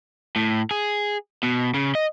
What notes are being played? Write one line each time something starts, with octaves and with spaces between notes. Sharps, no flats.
A2
G#4
B2
C#3
D#5